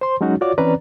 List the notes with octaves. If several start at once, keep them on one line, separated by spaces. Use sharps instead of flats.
C5 C6
F#3 G#3 C#4 D#4 F#4
F4 F#4 C#5 D5 D6
E3 C4 C#4 B4 D5 A#5